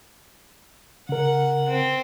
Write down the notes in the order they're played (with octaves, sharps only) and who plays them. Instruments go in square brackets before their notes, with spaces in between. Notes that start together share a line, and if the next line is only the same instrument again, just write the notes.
[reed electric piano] C#3 A#4 [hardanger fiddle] F#5
[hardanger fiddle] C4